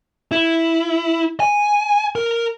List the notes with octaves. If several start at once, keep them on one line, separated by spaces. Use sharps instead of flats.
E4
G#5
A#4